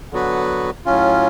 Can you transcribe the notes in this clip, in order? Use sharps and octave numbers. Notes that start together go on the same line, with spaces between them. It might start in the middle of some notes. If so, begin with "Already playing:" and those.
D3 F#3 B3 F#4 B4
A2 F#3 C#4 F4